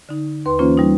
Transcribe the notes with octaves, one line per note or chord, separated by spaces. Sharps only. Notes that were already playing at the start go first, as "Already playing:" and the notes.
D3 D#4
D#2 B4 C6
E3 A#3 C#4 F4 C5
G3 D#4